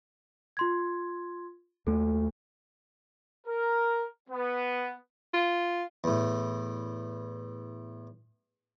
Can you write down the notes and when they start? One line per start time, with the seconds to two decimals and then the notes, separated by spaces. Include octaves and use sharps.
0.57 F4 C6 G#6
1.87 D#2 A3 A4
3.47 A#4
4.30 B3
5.34 F4
6.04 E2 A2